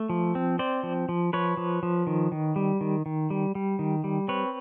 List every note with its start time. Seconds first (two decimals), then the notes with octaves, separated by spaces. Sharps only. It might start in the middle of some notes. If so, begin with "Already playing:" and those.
Already playing: A3
0.09 F3
0.35 C4
0.59 C4 C5 D5
0.83 F3
1.09 F3
1.33 F3 B4 C#5
1.57 F3
1.83 F3
2.07 D#3
2.32 D#3
2.56 G3
2.81 D#3
3.06 D#3
3.30 G3
3.55 G3
3.79 D#3
4.04 G3
4.28 C4 B4 C#5